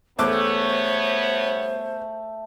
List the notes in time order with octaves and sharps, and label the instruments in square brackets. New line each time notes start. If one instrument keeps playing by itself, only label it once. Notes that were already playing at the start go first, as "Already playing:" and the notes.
[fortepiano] E2 D6 F#6 [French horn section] G2 B3 C#5 [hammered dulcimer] A3 [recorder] C5